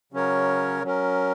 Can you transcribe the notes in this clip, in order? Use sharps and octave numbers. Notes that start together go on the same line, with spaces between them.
C#3 F#3 C#4 A#4 C#5
F#3 C#4 A#4